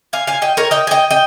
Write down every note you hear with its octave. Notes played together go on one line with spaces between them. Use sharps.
F5 G#5
F5 G#5
D#5 G5
A#4 C#5
D#5 G5
G#5
D#5 G5
D#5 G5